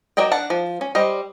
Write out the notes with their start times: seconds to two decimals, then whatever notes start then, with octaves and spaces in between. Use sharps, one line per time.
0.17 F#3 A#4 D5 D#5 G5
0.31 D4 F#5 A5
0.50 F3
0.81 C#4
0.95 G3 C5 D#5